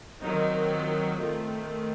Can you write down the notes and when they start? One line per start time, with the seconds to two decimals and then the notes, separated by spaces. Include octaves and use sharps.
0.20 D#3 F#3 C4 D#4
0.70 F4
1.19 D#3 A3 C4 F4